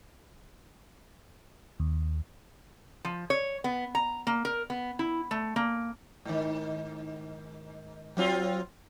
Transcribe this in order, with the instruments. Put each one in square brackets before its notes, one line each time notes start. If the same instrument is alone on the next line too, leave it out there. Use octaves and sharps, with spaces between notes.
[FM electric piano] D#2
[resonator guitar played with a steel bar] F3
C#5
B3
A#5
A#3
A#4
B3
E4
A3
A#3
[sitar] G#2 D#3
F#3 C4 F4